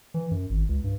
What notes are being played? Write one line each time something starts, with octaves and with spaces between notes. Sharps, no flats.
E3
F#2
G#1
C#2
G2